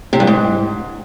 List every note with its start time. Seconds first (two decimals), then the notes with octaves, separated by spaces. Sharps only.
0.13 C3
0.20 G2
0.27 G#2